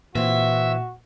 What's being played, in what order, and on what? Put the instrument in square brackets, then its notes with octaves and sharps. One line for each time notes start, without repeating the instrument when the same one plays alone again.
[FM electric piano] A#2 [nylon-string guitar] E3 C4 [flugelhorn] F#4 [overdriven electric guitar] E5